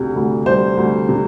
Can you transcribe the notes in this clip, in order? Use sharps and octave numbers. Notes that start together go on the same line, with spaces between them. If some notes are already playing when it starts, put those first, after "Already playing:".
Already playing: D2 C3
D2
G3 C5
D2
C3